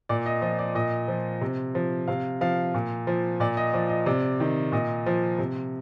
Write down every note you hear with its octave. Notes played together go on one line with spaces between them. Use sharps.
A#2 D5
D#5
F3 D#5
D5
A#2 D#5
F3
C3
F3
C3 F5
F3 F5
A#2
F3
A#2 D5
D#5
F3 D5
D#5
C3 D5
D#3
A#2 D#5
F3
C3